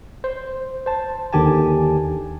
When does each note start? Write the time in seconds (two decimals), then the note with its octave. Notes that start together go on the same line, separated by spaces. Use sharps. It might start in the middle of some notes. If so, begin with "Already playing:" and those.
0.24 C5
0.86 C5 A5
1.33 D#2 D3 D#3 G4 G#5 A5